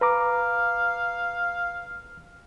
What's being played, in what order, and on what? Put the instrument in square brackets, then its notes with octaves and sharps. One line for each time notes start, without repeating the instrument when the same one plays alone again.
[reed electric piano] B4 A#5 D6 [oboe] F5